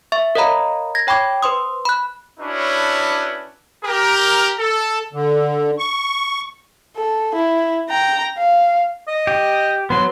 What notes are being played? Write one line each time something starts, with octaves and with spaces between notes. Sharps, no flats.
E5 C#6
A#4 C#5 D#5 F5 A#5 B5
G#6 A#6
C#5 G5 B5 C#6 D6 G#6
B4 C5 C6 D#6
B5 F#6
C#4 D4 E4 F#4 B4 C#5
G4 A#4
A4
D3
C#6
A4
E4
G5 A#5
F5
D#5
G4
F#3 B3 C6